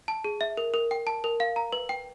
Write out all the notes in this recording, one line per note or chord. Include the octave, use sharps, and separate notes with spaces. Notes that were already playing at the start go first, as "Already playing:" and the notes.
A5
G#4
E5
A#4
A#4
G5
A5
A#4
F5
A#5
B4
G5